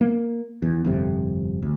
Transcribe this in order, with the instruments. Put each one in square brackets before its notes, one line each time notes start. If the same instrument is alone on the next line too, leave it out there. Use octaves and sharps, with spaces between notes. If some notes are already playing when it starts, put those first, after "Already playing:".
[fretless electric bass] A#3
E2
G1 F2 C3
D2